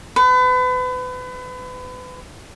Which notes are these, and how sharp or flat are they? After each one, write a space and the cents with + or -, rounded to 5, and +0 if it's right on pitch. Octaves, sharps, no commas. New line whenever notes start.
B4 +35